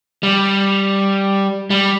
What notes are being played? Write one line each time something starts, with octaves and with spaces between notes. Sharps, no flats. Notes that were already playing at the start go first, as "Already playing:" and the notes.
G3
G3